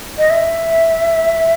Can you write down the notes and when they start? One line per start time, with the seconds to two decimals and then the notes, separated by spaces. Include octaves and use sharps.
0.18 D#5
0.30 E5